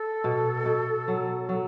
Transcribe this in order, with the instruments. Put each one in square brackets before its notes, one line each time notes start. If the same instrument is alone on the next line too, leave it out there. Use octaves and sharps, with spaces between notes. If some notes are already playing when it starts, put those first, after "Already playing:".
Already playing: [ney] A4
[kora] B2
B2
F#3
F#3